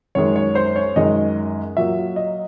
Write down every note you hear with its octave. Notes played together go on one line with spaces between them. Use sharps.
F#2 D#3 G#3 C#5
C#5
C5
C#5
F#2 D#3 G#3 D#5
A#2 F#3 A#3 E5
D#5